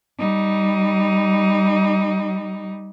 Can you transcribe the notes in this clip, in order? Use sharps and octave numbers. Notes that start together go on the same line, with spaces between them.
G3 D#4